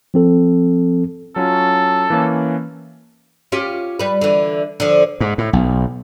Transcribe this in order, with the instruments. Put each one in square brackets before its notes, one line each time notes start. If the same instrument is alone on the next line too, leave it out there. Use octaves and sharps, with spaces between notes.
[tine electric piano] F3 C4 A4
[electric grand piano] F#3 C#4 F4 [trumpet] A4
[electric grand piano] E3 A#3 C#4
[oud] C#4 F4 G4
G3 B4
D3 E3
D3 F3
[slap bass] G#2
A2
B1